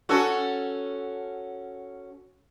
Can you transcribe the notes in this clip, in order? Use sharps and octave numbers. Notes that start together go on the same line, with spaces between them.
C#4 F#4 A4